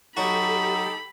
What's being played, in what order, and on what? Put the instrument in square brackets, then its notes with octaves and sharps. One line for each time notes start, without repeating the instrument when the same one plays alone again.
[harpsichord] F#3 F#4 [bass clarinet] D#4 [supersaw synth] G4 A4 [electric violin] B5